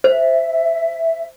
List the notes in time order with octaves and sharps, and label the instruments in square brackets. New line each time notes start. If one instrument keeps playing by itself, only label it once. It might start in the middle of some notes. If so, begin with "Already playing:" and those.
[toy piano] C5 [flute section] E5